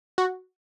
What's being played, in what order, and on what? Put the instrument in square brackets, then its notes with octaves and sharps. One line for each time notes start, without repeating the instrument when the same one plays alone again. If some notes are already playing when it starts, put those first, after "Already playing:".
[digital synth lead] F#4